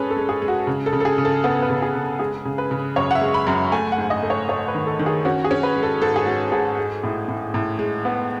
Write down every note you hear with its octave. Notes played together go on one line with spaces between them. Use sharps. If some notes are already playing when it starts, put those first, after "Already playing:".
Already playing: G#3 C#4 G#4 A4 B4
A4
G#3
G#4
G#3
F#4
C#3
A4
C#3
A4
G#4
C#3
A4
B3 A4
B4
C#3
G#4
C#3
G#3 G#4
C#3
B4
C#3
F#2 C#5
F#5
E5
G#3
B5
F#2
A3 G#5
F#5
G#2
D#5
A3
C#5
A3 C#5
B4
D#3
A4
D#3
G#4
C#4 F#4
G#4
C#4
B4
G#3
A4
G#2 A4
G#4
G#3 F#4
G#2 G#4
G#3
A2
A2
A2
G#3
B3